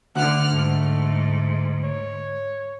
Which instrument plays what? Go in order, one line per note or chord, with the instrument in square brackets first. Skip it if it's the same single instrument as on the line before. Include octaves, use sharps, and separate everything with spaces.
[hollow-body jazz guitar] D2 [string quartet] D3 F6 F#6 [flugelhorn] F#5
[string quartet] G#2 [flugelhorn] A3
[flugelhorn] C#5